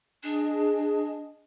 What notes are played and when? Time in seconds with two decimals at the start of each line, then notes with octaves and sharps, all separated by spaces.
0.23 D4 G#4 D#5